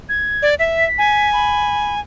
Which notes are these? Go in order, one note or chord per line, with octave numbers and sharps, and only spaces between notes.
G#6
D5
E5 B6
G#5
B5